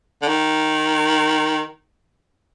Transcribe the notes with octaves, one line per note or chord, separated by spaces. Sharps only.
D3
D#3